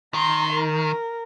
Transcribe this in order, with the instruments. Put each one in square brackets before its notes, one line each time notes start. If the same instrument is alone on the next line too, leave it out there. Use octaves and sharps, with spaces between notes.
[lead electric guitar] D#3 [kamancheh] A#5 C6
[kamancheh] A#4